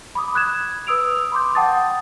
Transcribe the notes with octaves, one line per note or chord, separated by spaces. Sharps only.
B5 D6 D#6
B5 F#6 G#6 E7
B4 D#6 E6 D7 F7
B5 C6 D6 G6
F#5 G5 A5 D#6 A6